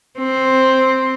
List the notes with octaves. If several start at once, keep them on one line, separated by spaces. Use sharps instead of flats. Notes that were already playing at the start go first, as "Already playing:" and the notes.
C4